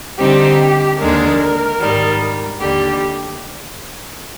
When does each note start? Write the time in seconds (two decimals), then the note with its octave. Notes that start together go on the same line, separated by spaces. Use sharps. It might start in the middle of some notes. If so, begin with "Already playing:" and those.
0.18 D3 G3 C4 D#4 G4
0.99 D#2 D3 G#3 D4 A#4
1.79 G#2 D#3 G3
2.60 D#2 D3 G3 G4